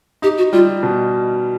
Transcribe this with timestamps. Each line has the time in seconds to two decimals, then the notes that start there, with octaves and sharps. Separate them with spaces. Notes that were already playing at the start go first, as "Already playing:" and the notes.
0.22 D#4 G4
0.38 F#4
0.53 G3 F4
0.83 B2